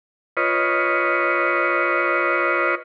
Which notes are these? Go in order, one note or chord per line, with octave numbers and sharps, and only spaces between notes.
F4 B4 C#5 D#5